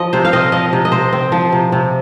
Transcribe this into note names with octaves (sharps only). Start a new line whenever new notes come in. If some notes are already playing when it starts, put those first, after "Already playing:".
Already playing: F3 D#5
C3 C5
F5
C4 D#5
F3 D#5
C3
D#5
C3 C5
C4
F3
C3
C3